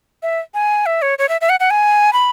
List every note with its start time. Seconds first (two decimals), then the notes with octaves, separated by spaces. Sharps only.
0.23 E5
0.54 G#5
0.86 E5
1.02 C#5
1.19 C#5
1.29 E5
1.41 E5
1.49 F#5
1.60 F#5
1.70 G#5
2.13 B5